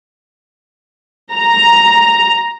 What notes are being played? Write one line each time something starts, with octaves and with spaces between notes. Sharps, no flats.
A#5